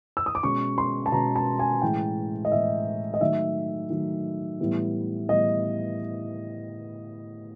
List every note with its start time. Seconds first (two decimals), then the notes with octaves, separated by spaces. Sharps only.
0.17 E6
0.26 D#6
0.35 D6
0.43 B2 G#3 C#4 C#6
0.78 C6
1.06 A5
1.12 B2 G#3 C#4 A#5
1.36 A5
1.59 G#5
1.82 A2 E3 G#3 G5
2.45 D#5
2.52 A2 E3 G#3 E5
3.14 D#5
3.20 D#3 F#3 A3 E5
3.90 D#3 F#3 A3
4.60 A2 E3 G3 B3
5.29 A2 E3 G3 B3 D#5